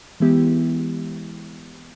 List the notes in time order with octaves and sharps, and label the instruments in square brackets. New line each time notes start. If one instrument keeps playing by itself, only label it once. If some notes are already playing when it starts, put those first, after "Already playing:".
[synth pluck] E3 G#3 B3 E4 G4